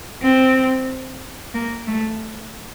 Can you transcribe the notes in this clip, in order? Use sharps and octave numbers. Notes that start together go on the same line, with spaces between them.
C4
A#3
A3